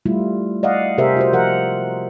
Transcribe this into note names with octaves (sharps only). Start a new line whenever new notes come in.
G3 A3 E4 F4
D5 D#5 F5 F#5
C3 G4 G#4 A#4 C5 E5
F4 F#4 C5
F3 A#4 F#5